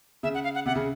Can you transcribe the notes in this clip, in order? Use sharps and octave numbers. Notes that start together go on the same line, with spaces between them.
C#3 E5
F#5
F5
F#5
C3 F#5
C#3